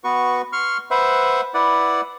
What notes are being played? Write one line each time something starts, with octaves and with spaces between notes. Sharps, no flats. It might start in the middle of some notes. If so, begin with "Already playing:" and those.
B3 F#4 B4 C#6
C6 C#6 F6
B4 C5 E5 F#5
E4 B4 D5 F#5